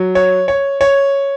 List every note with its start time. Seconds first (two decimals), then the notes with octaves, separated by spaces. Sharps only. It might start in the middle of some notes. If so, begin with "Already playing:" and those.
Already playing: F#3
0.15 C#5
0.48 C#5
0.81 C#5